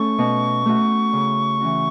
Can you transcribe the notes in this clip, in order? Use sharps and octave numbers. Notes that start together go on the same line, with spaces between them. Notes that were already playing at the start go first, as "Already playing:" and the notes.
Already playing: A3 C#4 A4 C#6
B2
A3 F#4
C#3
E3 C#4 F#4